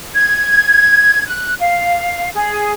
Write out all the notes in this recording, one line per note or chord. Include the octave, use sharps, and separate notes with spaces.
G#6
F#6
F5
G#4